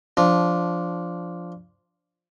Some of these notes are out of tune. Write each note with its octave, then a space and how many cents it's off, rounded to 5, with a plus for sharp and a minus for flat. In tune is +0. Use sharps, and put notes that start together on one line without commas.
F3 +0 D4 -10